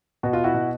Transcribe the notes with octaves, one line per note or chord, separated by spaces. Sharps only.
B2 F#4
F4
E4 F#4
B2